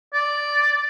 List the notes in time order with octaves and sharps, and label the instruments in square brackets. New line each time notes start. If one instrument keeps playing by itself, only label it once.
[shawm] D5